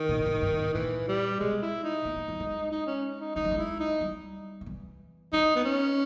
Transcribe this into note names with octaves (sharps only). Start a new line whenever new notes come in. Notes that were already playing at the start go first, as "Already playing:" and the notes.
Already playing: D#3
A#2
G#2
E2
G2
G#2
A#2 E3
G3
B2 G#3
E4
D#4
A#3
G#3
G3
G#3
D#4
C#4
D#4
G#3 D#4
G3
G#3
E4
D#4
G3
D#3
E3
G3 D#4
B3
C#4